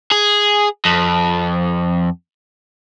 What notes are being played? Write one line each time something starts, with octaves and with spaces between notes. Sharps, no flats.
G#4
F2